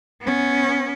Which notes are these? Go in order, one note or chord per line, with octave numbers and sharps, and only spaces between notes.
B3 C#4